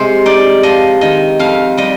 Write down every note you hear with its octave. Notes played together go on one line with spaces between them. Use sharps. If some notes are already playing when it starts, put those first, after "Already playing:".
Already playing: C3 G#3 C5
D#4 D5
F3 D#5
D#3 D#5
F2 F5
G3 D#5